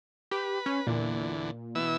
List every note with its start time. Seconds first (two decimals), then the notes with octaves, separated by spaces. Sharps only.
0.31 G4 B4
0.66 C#4
0.87 E2 A#2 D3
1.75 B2 E3 E6